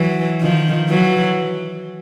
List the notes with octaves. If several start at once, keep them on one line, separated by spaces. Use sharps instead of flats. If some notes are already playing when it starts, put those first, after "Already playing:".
Already playing: E3 F#3
D#3 F3
E3 F#3